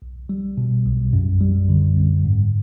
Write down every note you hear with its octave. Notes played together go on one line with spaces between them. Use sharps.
B1
G3
B2
B1
F#2
G3
D3
C4
G#2